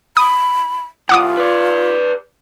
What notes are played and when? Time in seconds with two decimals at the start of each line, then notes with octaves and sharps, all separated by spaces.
0.17 B5 D#6
1.09 C2 F4 F#5 D6 D#6
1.37 B4 D5